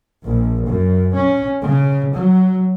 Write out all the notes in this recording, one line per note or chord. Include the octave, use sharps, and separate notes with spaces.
A#1
F#2
C#4
C#3
F#3